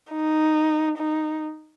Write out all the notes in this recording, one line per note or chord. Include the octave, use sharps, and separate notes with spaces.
D#4
D#4